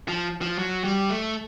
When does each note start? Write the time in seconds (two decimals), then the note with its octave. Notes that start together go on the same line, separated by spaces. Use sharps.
0.08 F3
0.41 F3
0.58 F#3
0.84 G3
1.10 A3